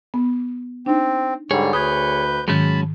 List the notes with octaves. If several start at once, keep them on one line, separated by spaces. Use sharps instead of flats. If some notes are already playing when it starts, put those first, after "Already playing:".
B3
C4 D4 D#4
G#2 D3 G3 G#4 C#5
D2 B4 D#6 G6 G#6
G#2 D#3 F#3 G#3 C#4 A5 B5